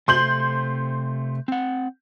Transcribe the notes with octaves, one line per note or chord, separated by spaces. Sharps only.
C3 A3 C5 C6 G6 F#7
C4 F#5